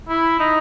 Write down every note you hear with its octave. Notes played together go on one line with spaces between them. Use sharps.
E4
D#4